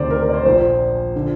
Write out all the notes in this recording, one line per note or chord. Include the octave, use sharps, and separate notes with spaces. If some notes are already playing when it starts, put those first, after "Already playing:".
Already playing: D2 C3 D#3 C5 D5
A#4
A#4
D5
C5
A#1 A#2 F3 C5
D3 F3